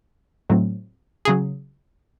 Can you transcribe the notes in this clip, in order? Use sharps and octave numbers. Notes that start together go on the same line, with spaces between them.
A2 F#3 A3 C4
C#3 F#3 G#4